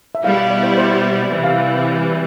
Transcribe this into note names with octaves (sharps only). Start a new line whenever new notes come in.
E5
B2 G3 B3 E4 F5
F5
D5
C5
C5
C3 E3 G3 E5
F5